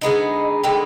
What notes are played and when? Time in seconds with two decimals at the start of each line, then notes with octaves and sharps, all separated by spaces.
0.01 D3 G#3 B3 D#4 D#5
0.63 D3 G#3 B3 D#4 G5